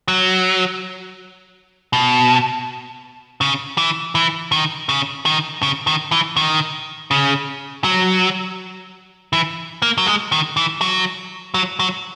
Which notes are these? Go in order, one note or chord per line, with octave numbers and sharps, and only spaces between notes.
F#3
B2
C#3
E3
E3
D#3
C#3
D#3
C#3
D#3
E3
D#3
C#3
F#3
E3
A#3
F#3
G#3
D#3
E3
F#3
F#3
F#3